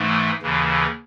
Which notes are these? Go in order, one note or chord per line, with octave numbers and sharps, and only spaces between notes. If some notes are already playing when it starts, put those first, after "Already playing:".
Already playing: G#2 E3 A3
D#2 C#3 E3